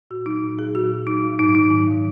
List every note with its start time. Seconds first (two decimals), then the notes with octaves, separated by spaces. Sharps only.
0.11 A#2 F#4
0.26 F#3 D#4
0.43 A#2
0.59 F#3 G#4
0.75 A#2 F#4
0.90 F#3
1.07 A#2 D#4
1.23 F#3
1.39 G#2 D#4
1.55 D#3 F#3 D#4
1.71 G#2
1.88 D#3 F#3